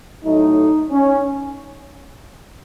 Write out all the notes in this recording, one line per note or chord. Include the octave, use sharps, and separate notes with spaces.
A2 F#3 A3 D#4
C#4